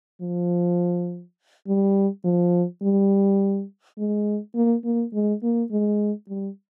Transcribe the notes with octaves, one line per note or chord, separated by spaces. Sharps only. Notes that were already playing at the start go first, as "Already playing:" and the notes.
F3
G3
F3
G3
G#3
A#3
A#3
G#3
A#3
G#3
G3